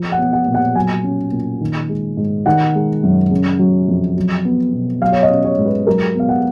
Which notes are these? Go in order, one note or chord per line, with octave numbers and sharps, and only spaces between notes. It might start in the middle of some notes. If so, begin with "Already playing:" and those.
Already playing: F3
F#5
B3
F#5
A#2
F#5
F#3 G#5
C#4
A#2
D#3
G#3
G#2
D#3 F#5
G#3
F#2
C#3
F#3
F2
F#3
B3
B2
F#3 F5
C#5
D#5
C#4
C#5
G#2
B4
F#3 A#4
B3 F5
F#5